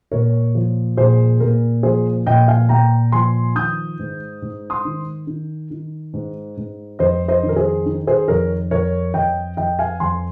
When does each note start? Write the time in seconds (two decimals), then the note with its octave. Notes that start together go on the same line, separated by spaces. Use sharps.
0.11 A#2 A#4 C#5
0.55 F3
0.97 A#2 G#4 C5
1.40 A#2 A#4
1.83 F3 G#4 C5
2.26 A#2 D#5 G5
2.48 F5 G#5
2.69 A#2 G5 A#5
3.12 F3 G#5 C6
3.55 D#3 D#6 G6
3.99 G#2
4.42 G#2
4.70 C6 D#6
4.85 D#3
5.27 D#3
5.71 D#3
6.14 G#2
6.57 G#2
6.99 F2 C5 D#5
7.28 C5 D#5
7.43 D#3
7.49 A#4
7.56 G#4 C5
7.86 D#3
8.07 G#4 C5
8.28 F2 A#4 C#5
8.71 F2 A#4 C#5
9.14 F2 D#5 G5
9.57 F2 D#5 G5
9.79 F5 G#5
10.00 F2 G#5 C6